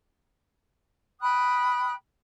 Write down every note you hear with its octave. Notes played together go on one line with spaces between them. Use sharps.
G5 B5 D#6 F#6